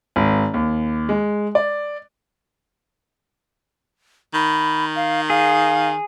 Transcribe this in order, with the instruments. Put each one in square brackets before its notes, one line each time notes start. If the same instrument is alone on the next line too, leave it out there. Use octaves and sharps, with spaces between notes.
[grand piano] G#1
D#2
G#3
D5
[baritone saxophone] D#3 [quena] B5
[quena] F5
[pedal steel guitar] G#4 [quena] F5